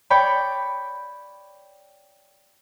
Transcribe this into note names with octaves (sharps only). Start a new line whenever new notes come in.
C#5 D5 G5 B5